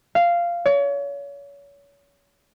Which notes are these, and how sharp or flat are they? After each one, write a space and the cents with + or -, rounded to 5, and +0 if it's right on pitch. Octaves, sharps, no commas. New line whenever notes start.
F5 -10
C#5 +35